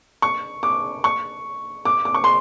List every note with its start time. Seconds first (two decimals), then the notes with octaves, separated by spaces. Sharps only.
0.22 C#6
0.63 D6
1.04 C#6
1.85 D6
2.05 D6
2.14 C#6
2.24 C6